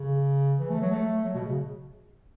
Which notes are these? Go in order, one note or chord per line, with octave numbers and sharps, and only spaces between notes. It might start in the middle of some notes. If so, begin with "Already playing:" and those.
Already playing: C#3
E3
A3
F#3
A3
F#3
B2
C#3